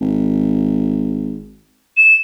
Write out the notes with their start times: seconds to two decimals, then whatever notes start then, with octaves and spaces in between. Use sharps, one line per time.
0.01 G#1
1.97 E7